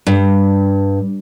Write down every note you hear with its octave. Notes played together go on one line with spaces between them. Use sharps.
G2